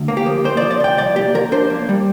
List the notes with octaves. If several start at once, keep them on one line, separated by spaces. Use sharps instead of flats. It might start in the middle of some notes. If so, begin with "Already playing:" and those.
Already playing: D2
A#3
G4
F3
A#3 C5
D5
F3
D5
C3 G5
C2 D5
A#3 G4
F3 A#4
D4 C5
A#3
G3